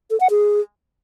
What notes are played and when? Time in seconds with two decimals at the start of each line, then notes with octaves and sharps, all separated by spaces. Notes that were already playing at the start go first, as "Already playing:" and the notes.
0.11 A4
0.20 F#5
0.30 G#4